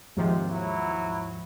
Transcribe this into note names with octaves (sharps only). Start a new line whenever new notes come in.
D#2 G#2 C3 F3
F#3 E4